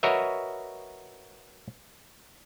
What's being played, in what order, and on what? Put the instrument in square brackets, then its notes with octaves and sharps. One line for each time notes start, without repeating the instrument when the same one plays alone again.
[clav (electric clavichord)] F#4 A#4 B4 C#5 D#5 E5